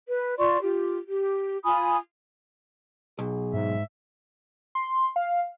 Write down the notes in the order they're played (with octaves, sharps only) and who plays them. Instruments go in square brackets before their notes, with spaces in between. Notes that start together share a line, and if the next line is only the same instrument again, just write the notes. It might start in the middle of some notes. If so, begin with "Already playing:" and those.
[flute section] B4
F4 D5 C6 C#6
F4 G4
G4
F4 G#5 B5 D#6
[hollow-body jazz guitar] B1 [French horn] G#4
[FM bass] G#2 [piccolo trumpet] E5
[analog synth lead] C6
F5